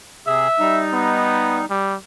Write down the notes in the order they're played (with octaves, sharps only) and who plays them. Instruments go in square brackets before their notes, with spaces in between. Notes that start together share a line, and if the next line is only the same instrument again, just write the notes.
[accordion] C3 G#4 [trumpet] E5
[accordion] G3 D#4
[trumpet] B3
G3